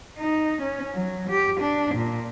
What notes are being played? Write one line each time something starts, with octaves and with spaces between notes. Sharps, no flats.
D#4
C#4
F#3
G4
D4
A#2